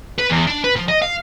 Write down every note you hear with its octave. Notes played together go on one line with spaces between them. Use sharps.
B4
E2
D4
B4
F3
D#5
F5